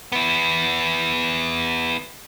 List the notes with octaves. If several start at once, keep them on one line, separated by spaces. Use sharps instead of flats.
B3 E4